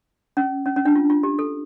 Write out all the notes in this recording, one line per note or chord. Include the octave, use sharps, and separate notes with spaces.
C#4
C#4
C#4
D4
F4
F4
G4
A4